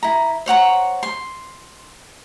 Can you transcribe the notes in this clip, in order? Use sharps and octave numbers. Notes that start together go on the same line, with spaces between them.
E4 A#5
C5 C#5 F#5 A#5
C6